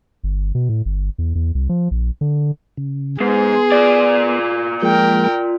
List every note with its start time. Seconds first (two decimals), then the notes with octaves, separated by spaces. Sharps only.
0.24 G1
0.55 B2
0.69 A2
0.85 G1
1.18 E2
1.35 E2
1.55 C2
1.69 F3
1.91 A#1
2.21 D3
2.77 C#3
3.21 G#2 B3 G#4 C6
3.72 F4 D5
4.82 F3 G#3 A#3 A#4 G5